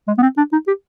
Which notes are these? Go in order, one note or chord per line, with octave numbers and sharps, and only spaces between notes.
G#3
B3
C4
D4
D#4
G4